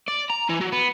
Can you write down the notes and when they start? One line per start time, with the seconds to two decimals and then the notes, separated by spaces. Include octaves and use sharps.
0.08 D5
0.30 A#5
0.49 E3
0.61 F#3
0.72 B3